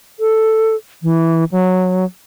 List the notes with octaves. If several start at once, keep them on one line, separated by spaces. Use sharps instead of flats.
A4
E3
F#3